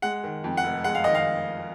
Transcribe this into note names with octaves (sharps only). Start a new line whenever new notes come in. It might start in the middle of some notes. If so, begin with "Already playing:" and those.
G#3 F#5
D#3
F2
F#5
F1
G#3 F#5
F5
D#3 D#5
F5